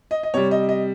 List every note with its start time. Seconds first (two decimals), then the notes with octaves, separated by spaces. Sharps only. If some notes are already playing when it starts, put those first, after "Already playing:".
0.11 D#5
0.23 D#5
0.34 C3 G3 C#5
0.51 D#5
0.69 D#5